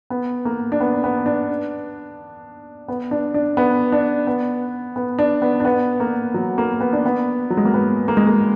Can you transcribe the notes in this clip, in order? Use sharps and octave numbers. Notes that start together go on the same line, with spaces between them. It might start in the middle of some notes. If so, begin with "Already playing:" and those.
B3
A#3
D4
B3
B3
D4
B3
D4
D4
B3
D4
B3
B3
D4
B3
D4
B3
A#3
F#3
A#3
B3
D4
B3
F#3
G#3
A#3
B3
A#3
G#3
A#3